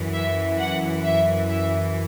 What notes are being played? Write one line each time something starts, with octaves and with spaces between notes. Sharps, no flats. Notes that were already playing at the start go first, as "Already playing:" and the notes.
Already playing: F#2 E3
E5
F#5
E5
E5